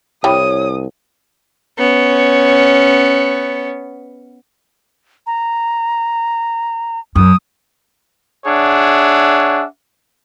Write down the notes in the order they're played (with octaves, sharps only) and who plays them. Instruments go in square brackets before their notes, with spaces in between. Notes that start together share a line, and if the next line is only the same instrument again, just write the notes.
[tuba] C2 [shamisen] G3 E4 G4 [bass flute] C#5 [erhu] D#6
[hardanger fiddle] B3 C#4
[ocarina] A#5
[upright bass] F#2 [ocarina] D#6
[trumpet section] D4 G#4 C#5 E5 F#5